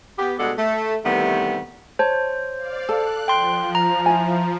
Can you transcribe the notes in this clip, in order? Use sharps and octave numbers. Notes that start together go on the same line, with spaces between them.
B3 G4
G2 B2 G#3 D4 A4 F#5
A3
C3 D#3 E3 G3 A3 B3
C5 C#5 A5
D5 F5
A4 F#6
F3 G5 C6
A#5
E4 G#5